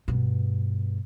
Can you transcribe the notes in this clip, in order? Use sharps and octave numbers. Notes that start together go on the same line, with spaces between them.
G2 B2